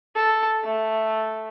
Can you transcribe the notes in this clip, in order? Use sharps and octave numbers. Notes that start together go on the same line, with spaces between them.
A4
A3